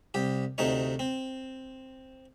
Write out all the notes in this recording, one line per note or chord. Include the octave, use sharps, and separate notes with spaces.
C2 G4
D2 C3 A3 D#4 C#5
C4